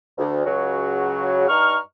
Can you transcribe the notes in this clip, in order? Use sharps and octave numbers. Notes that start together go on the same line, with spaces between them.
D2
C#2 C#3 F#3 F#4
G2 D#4 A#5 C#6 F6